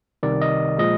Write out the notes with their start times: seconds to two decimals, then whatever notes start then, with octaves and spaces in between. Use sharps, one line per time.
0.23 C2 C3 D#3 D5
0.42 D#5
0.78 A#2 F3 G#3 D#5